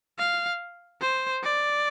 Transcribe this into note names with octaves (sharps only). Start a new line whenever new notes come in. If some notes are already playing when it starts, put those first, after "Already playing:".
F5
C5
D5